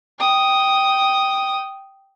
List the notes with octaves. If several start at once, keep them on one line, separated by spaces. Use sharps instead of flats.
G5 D#6